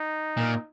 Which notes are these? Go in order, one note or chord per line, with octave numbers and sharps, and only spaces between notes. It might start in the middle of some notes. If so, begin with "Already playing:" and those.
Already playing: D#4
A#2